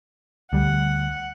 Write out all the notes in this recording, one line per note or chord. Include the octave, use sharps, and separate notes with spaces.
D2 G3 F#5